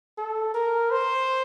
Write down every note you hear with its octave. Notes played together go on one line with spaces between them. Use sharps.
A4
A#4
C5